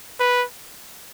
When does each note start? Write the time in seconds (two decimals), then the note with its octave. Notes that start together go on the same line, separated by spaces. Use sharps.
0.19 B4